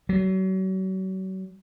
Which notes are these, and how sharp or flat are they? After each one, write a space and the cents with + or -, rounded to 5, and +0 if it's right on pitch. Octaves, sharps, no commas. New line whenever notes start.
F#3 +35